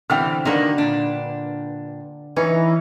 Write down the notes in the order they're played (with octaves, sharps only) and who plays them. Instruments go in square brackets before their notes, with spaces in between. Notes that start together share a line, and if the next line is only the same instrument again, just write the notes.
[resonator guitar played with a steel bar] D3 E3 C4 [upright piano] G5 F6
[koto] D3 B4 [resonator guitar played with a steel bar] D#3 A#3 F#4
[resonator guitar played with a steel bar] A#2 D4
[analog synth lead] E3 [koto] C#4 [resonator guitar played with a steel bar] D#4